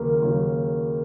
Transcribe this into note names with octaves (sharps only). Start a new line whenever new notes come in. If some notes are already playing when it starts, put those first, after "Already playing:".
Already playing: D#2 C#3 F#3 A#4
D#2 C#3 F#3